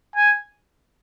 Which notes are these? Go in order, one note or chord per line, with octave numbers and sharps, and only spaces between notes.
G#5